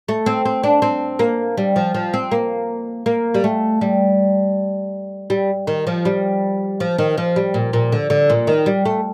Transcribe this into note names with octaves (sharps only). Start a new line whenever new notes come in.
A3
C4
C4
D4
C4
A#3
G3
F3
F3
C4
A#3
A#3
G3
A3
G3
G3
D#3
F3
G3
F3
D#3
F3
G3
A#2
A#2
D3
D3
A#2
D#3
G3
A3